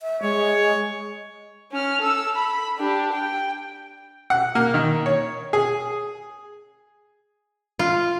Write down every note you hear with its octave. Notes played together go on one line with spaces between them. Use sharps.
E5
G#3 C#5
C#4 F6
A4 E6
B5
D4 G4
G5
F#5
A#3
D#3
C#5
G#4
F4